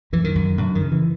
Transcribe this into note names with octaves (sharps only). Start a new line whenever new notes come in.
F#2 E3
D#3
F#2
F#2 D3
D#3
C#3
E3